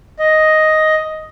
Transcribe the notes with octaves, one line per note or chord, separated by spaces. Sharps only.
D#5